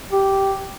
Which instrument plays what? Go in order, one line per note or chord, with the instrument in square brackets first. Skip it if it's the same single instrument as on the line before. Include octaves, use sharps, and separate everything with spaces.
[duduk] G4